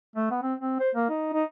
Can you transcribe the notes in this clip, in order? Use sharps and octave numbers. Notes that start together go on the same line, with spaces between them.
A3
B3
C4
C4
C5
A#3
D#4
D#4